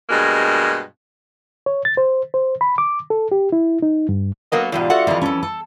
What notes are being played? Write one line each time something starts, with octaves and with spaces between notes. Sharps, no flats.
G2 B2 G#3 A#3
C#5
A6
C5
C5
B5
D6
A4
G4
E4
D#4
G2
F#3 A#3 B3 A4 A#4 D#5
E2 G#2 B2 G3 D4 F4
F#4 A4 E5 F#5
F2 E3 D5 D#5 A#5
C#4 A4 A5
A4